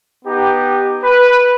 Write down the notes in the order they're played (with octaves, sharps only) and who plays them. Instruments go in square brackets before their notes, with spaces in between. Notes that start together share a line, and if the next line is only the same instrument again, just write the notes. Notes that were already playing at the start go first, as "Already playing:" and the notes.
[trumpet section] B3 D#4 G4
B4